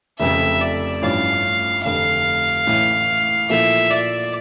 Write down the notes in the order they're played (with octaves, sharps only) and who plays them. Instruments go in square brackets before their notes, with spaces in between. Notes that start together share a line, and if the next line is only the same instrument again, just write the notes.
[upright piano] F1 F2 C#3 [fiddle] E5
[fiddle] D5
[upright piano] A1 G2 F3 C#4 E4 [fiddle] F5
[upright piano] F1 F2 D3 [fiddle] F5
[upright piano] A1 A2 E3
[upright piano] A#2 F3 A3 E4 [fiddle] E5
[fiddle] D5